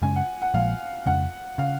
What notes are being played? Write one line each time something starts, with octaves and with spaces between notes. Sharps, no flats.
F#2 C#3 G#3 C#4 G#5
F#5
F#5
A#1 A#2 F3 G#3 F5
F2 C#3 G#3 C#4 F#5
C#3 F5